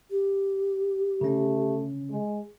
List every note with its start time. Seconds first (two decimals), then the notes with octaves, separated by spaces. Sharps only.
0.10 G4
1.21 C#3 A3 C#4
2.10 G#3